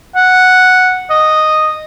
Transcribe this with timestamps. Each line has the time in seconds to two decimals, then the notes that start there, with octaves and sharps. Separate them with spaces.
0.15 F#5
1.10 D#5